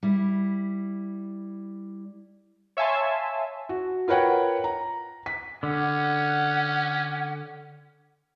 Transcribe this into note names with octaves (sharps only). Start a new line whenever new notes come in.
G3 E4
C#5 E5 F5 G#5 A5 C6
F#4
F4 A#4 B4 C#5 F#5 G5
A#5
B6
D3 C#4 F#5